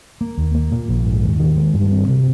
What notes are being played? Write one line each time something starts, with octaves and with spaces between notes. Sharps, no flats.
A#3
D#2
A#3
A#2
A#1
G#2
D#2
D#3
G#3
G2
C4
C3